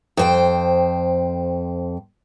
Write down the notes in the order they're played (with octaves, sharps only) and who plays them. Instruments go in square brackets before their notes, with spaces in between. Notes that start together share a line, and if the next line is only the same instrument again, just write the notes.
[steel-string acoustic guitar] F2 C5 G5